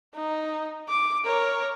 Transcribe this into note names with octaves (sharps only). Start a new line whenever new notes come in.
D#4
D6
A#4 C#5